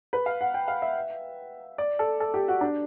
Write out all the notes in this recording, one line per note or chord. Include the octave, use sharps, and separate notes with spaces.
B4
F5
F#5
G5
F5
E5
D5
A4
A4
G4
F#4
D4